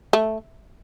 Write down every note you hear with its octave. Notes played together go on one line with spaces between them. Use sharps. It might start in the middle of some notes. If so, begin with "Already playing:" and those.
A3